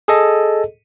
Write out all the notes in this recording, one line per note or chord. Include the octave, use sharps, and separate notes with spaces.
G#4 A4 D#5